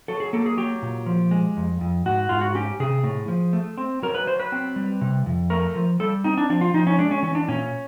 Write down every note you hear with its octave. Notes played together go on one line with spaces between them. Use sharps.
F#3 A4
G#4
A#3 A4
G#4
F#3 G4
A#2
F3
G#3
F2
F2
G#2 F#4
G#2 F4
F#4
C#4 G4
C3 G#4
A2
F3
A3
C4
F#3 A#4
B4
F#3 C5
B4
C4
G3
C3
F2
A3 A#4
F3
G3 A4
C4 D#4
D4
F3 D4
F4
F3 D#4
C#4
G#3 D4
C#4
E3 C#4
D4
A#2 C#4